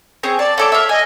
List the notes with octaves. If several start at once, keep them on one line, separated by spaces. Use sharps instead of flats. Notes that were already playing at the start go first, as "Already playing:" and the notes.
C4 G#4 C#5
D5 A5
A3 A4 C#5 D6
E5 F5
D#5 G#5